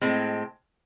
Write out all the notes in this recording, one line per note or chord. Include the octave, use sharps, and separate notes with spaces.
A2 G#3 C4